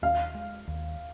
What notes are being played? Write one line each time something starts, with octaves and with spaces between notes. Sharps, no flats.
D#2 F5
G#3
D#2